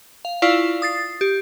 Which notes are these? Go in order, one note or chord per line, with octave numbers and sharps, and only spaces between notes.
F5
E4 F4 D5 F5 C#6 E7
D#6 A6 C7
G4